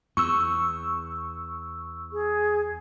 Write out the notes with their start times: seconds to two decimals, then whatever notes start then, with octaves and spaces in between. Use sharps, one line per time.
0.17 E2 C#6 E6
2.13 G#4